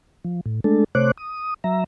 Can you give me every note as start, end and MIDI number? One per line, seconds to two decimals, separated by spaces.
0.24 0.41 53
0.46 0.60 45
0.64 0.84 56
0.64 0.84 57
0.64 0.84 62
0.64 0.84 69
0.95 1.11 48
0.95 1.11 57
0.95 1.11 72
0.95 1.11 73
0.95 1.11 86
0.95 1.11 90
1.17 1.54 87
1.64 1.84 54
1.64 1.84 76
1.64 1.84 82